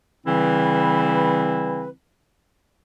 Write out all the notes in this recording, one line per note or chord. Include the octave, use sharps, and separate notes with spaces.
C#3 E3 G3 C4 E4 B4